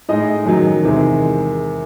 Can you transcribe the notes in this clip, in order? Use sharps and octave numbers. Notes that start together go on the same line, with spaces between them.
A2 G#3 D#4 D#5
F#2 D#3 F#3
E2 C3 D#3 G#3